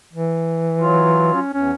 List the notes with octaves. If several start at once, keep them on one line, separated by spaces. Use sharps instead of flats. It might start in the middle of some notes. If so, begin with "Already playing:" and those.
E3
F#3 F4
C#4
E2 C#4